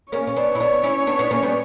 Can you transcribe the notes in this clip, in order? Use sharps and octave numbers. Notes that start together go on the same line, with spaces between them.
A#3 C#4 C#5
C#4
B3 D4
E4
B3 D4
C#4 E4
B3 D4
B3 D4
A#3 C#4
G3 B3